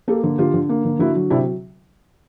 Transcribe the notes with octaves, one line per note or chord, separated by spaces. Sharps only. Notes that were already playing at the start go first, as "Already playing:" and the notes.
A#3 G4 A4
D3
D3 F4 G4
D3
A#3
D3
D3 E4 F#4
F#3
C3 D4 E4